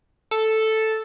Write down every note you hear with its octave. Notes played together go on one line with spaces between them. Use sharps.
A4